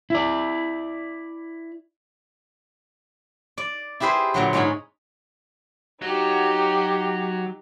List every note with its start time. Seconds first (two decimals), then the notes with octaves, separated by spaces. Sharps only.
0.10 E4 D5
3.58 D5
4.00 E4 G4 G#4 B4 C5
4.34 A#2 D3 F#3
4.53 G#2 G#3 C#4 D#4 G#5 B5
6.02 F#3 D#4 G4